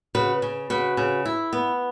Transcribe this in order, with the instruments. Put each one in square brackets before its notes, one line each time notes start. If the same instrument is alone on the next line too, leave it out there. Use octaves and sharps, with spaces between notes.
[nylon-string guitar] C#3 F#4 B4
C#3
C#3 F#4 B4
C#3
E4
B3